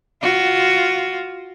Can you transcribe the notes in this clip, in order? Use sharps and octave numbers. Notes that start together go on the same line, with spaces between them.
F4 F#4